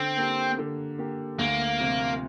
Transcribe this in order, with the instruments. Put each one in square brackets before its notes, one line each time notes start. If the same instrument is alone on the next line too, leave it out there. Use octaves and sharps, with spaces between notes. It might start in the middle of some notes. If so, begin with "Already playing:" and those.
Already playing: [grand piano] D3 [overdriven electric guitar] C4
[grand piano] A#3 G4
D3
A#3 G4
[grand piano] D2 [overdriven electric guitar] A#3
[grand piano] C3 F3 C4 F4